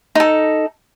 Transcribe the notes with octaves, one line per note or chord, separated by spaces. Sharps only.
D#4 A4